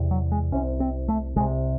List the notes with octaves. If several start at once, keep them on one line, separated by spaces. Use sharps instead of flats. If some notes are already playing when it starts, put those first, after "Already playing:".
Already playing: E2 C3
F#3
G#3
C2 C3 C#4
C4
A3
C2 C3 G#3